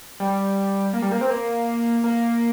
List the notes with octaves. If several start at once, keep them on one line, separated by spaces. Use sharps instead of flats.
G3
A#3
G3
A#3
C4
A#3
A#3